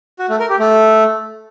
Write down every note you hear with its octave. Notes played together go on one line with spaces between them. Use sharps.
F#4
A3
A#4
G4
A3